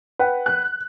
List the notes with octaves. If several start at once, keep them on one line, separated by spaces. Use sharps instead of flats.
B4 F#5 G5
F#6